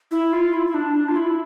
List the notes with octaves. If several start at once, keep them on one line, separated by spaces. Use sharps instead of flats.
E4
F4
E4
E4
D4
D4
F4
E4